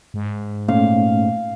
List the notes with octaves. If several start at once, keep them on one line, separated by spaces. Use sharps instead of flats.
G#2
A#2 A3 C#4 F5